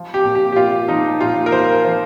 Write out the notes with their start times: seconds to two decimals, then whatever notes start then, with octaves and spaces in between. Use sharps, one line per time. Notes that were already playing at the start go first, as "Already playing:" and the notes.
Already playing: F3
0.14 G4
0.25 A#2
0.35 G4
0.52 G4
0.56 A#2 F4
0.88 F3 D#4
1.21 A#2 F4
1.46 A#4
1.52 F3 C5
1.85 F3 C5